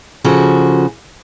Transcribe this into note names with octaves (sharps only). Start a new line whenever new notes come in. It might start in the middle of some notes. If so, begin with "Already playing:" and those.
C#3 F3 F#4 A4